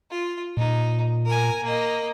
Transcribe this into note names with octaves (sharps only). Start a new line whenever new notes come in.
F4
A#2 D#4
A#4 G#5
A#3 D#5